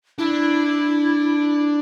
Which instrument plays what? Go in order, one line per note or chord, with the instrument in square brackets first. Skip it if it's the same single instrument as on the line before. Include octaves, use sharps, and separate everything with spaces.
[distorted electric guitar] D4 [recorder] E4